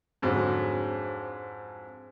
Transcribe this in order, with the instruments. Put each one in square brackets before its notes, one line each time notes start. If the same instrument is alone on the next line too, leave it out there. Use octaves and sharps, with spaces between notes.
[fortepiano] F2 G#2 D3 F#3